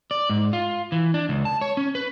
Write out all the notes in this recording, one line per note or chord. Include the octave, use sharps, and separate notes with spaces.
D5
G#2
F4
E3
D4
C#2
A5
C#5
C#4
B4